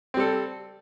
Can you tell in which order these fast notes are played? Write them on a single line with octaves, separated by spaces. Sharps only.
C4 G3 A4